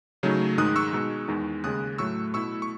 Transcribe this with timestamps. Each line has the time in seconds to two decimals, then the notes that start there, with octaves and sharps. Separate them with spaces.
0.23 C#3 F#3 A3 D#4
0.58 G#2 D#3 G#3 D#4 D#6 F#6
0.76 C#6 E6
0.93 B2 G#3 D#4
1.28 E2 D#3 G#3 D#4
1.64 D#2 C#3 G#3 D#6 F#6
1.98 A2 F#3 A3 C#6 E6
2.34 B2 A3 E4 C#6 E6
2.62 C#6